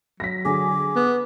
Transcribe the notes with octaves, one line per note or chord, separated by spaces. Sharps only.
F#3 A#6 B6
D3 G#4 D6
B3